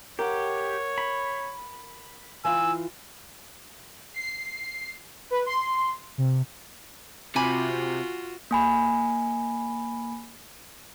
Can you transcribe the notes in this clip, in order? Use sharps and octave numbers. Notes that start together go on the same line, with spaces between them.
G4 A#4 C#5 F#5
B5
E3 F4 G#5 E6
C7
B4
C6
C3
C3 F4 F#4 G#5 B5 D6
A#3 G#5 B5